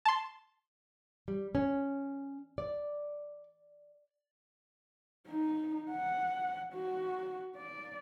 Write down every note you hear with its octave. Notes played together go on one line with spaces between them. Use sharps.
A5 C6
G3
C#4
D5
D#4
F#5
F#4
D5